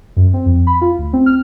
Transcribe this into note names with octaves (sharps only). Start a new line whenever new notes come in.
F#2
C4
F2
B5
F4
D2
C4
F6